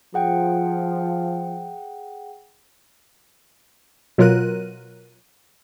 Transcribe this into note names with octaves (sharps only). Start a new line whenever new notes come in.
F3 G#4 F#5 G5
B2 F#3 F4 A#4 F#6 D#7